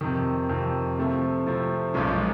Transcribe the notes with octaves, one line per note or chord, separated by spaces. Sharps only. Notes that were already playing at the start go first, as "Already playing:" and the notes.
F2 C3 D#3
F2 C3 D#3
C3 F3 A3 C4 E4
C3 F3 A3 C4 E4
B1 A#2 F3 G#3 C#4